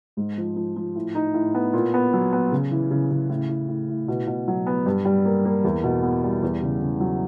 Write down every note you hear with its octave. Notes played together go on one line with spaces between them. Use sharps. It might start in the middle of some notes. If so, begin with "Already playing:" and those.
G#2
F3
F3
F3
A2
D#4
A2
B3
A#2
B3
F#3
B3
C#3
E3
C#3
C#3
A2
A2
A2
A2
B2
B2
F#3
B3
G2
G3
A#3
A#3
E2
B2
B3
G3
E2
C#3
C#3
F#3